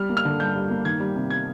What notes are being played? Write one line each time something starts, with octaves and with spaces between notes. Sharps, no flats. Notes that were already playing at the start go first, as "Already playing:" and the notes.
Already playing: G3 F6
A#3
F6
D3
G2 G6
G3
A#3
D#3 G#6
G3
C3
G#6